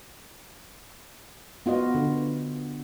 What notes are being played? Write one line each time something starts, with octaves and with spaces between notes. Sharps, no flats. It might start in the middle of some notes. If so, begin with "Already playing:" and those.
B3 F4 F#4 D#5
D3